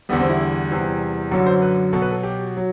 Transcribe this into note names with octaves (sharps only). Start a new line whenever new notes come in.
E2 D3 G3 B3
C4
E4
E2 C3 E3 G3
F#2 D3 F#3
C5
B4
B2 F#3 A4
B4
A4
G4
F#3